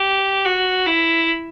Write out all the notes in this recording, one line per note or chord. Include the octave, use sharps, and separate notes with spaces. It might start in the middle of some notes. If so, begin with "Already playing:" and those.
Already playing: G4
F#4
E4